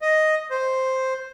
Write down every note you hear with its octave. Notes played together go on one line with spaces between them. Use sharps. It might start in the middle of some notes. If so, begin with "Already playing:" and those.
D#5
C5